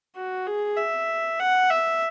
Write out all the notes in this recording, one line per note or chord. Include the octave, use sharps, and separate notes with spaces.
F#4
G#4
E5
F#5
E5